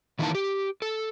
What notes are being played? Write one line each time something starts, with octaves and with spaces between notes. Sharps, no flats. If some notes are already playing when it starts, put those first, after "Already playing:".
D#3 E3 A#3 D#4 A#4 A5
G4
A4